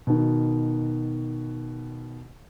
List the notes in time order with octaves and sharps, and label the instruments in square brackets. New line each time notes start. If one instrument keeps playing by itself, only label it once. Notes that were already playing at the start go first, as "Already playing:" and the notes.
[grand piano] B2 D#3